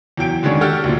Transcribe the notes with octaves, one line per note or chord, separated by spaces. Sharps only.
E2 F#3 G5 D7
D3 D#3 G#3 C#4 D4
F#4 G4 A4 G5 F6
D2 A#2